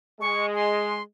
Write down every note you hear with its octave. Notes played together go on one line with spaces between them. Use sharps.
G#3 C#6
C6